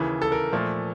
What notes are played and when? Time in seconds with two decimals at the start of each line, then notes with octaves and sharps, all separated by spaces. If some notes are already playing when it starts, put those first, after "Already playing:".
Already playing: D#2 C#3 E3
0.22 A4
0.32 A#4
0.52 A#2 F3 A3